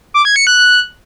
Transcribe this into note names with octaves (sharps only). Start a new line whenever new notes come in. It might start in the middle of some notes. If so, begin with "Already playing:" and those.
D6
G#6
C#7
F#6